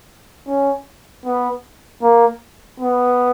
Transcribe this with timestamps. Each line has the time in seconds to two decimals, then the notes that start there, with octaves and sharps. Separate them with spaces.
0.47 C#4
1.26 B3
2.02 A#3
2.80 B3